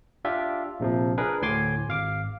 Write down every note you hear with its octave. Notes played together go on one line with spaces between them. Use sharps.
D4 F4 G4 E5
A#1 C3 F3
D4 G#4 A#4 B4
D2 A2 G#5 C6 D6
G#1 F5 D6